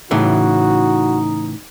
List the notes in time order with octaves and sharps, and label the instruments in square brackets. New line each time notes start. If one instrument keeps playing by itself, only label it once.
[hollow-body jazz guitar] A2 C#3 E3 [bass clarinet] D#4 [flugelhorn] F#4